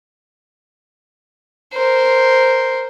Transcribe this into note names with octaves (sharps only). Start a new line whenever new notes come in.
A#4 C5